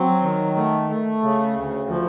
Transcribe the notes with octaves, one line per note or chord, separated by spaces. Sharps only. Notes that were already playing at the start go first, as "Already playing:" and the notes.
Already playing: F#3 C4
D#3
A3
A3
C#3
D2
F3